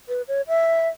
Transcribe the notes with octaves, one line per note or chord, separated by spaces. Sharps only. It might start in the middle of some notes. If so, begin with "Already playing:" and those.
B4
C#5
E5